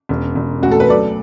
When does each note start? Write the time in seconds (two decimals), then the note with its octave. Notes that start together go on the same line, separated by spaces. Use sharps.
0.09 E1
0.35 E1
0.62 D2 F#4
0.72 A4
0.80 B4
0.89 F#3 A4 D5